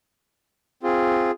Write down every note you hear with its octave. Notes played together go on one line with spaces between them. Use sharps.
C4 F4 G#4